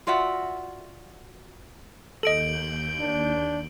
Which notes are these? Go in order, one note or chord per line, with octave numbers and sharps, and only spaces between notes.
F4 F#4 D5 E5 F#5
D#2 A4 D#5 G6 D7 F#7
D4